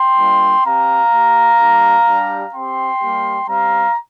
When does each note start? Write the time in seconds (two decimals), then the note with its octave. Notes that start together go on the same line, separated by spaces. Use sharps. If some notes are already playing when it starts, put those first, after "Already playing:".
Already playing: G5 C6
0.18 G3 A#3 D4 F4
0.65 C4 G4 F5 A#5
1.13 A#3 G4
1.59 G3 D4 G4
2.07 G3 D4 G4
2.54 C4 G4 G5 C6
3.02 G3 A#3 G4
3.48 G3 C4 G4 F5 A#5